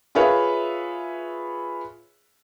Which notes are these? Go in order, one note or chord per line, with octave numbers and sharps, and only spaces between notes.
F4 G#4 B4 C#5 E5 F5